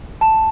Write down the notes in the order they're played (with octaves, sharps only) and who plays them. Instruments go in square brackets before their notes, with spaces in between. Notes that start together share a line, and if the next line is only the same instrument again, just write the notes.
[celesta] A5